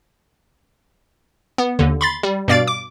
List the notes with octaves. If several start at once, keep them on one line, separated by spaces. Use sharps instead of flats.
B3
D#2 D3
B5 C6 A6
G3
G2 B2 D5 F5 A6 D7
D6